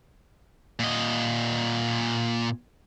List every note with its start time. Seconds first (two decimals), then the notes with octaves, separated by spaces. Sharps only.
0.80 A#2 D#5